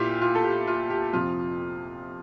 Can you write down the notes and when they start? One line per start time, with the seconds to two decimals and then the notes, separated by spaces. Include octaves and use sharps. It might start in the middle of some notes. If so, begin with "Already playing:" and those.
Already playing: A#2 E4 F4 G4
0.21 F4
0.35 A4
0.44 G4
0.67 F4
0.90 G4
1.13 F2 C3 F3 F4